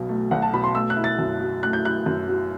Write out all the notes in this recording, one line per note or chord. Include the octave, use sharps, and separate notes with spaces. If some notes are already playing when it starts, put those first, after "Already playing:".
Already playing: B1 B2 F#3
A3
B1 F#5
A5
B2 B5
C6
A3 E6
F#6
E4
A6
F#2
F#3
A3 F#6
G6
E4 F#6
F#2
F#3